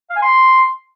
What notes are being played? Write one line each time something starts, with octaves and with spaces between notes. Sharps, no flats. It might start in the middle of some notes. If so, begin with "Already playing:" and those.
F5
G#5
C6